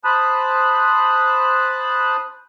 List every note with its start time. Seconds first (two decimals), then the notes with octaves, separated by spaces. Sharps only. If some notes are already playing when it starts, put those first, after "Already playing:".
0.04 C5 A5 B5 D#6 F#6